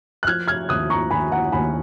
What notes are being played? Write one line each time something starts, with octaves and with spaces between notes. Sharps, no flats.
F#6
F3 F6 G#6
F6 G#6
D#2 D#6 F#6
A#5 C#6
D#2 G#5 B5
F#5 A#5
D#2 G#5 B5